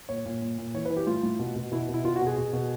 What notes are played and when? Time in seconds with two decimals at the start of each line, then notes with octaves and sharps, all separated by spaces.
0.09 A#2 C#5
0.25 A#2
0.42 A#2
0.58 A#2
0.74 E3 C#5
0.85 B4
0.90 E3
0.97 G4
1.07 A2 F4
1.23 A2
1.39 B2
1.56 B2
1.72 B2 E4
1.89 B2
1.94 E4
2.04 B2 F4
2.16 F#4
2.22 B2 G#4
2.38 B2
2.53 B2